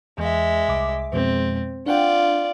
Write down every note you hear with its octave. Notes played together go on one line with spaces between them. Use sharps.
E2 G#3 E5
C2 D6
F2 B2 G#3 C4
D4 F4 D5 F#5 G5